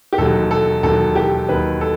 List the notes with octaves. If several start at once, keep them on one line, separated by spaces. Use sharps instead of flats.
G4
E1 D#2 D#3 F#3 A4
A4
E1 D#2 D#3 F#3 A4
G4
D#2 D#3 F#3 B4
A4